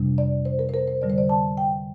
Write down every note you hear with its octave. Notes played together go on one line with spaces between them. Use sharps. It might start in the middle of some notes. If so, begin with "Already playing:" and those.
Already playing: F2 C3 G3 D4
D5
C5
A#4
C5
A#4
C5
F2 D3 G3 D5
C5
D5
A5
G5